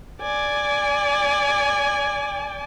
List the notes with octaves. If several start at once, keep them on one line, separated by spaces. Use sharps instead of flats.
D5 G#5